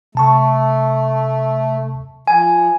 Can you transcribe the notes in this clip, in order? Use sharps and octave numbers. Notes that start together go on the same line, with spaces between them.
C3 A3 A5 C#6
F3 G#5